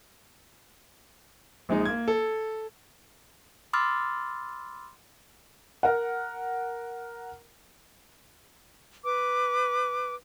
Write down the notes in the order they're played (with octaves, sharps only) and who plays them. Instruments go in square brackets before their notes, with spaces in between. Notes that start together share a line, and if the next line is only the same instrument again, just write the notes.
[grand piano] A#1 G#3 D#4
A#3 G#6
A4
[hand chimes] B5 C6 D6 E6 F6 A6
[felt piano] A#4 F#5
[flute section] B4 D6